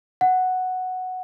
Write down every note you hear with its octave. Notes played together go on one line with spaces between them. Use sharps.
F#5